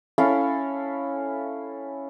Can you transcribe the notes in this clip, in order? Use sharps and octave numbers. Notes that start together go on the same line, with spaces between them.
C#4 E4 A4 F5